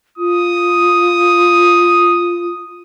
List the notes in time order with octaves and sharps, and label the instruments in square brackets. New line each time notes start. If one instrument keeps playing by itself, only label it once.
[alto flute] F4 [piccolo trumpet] D#6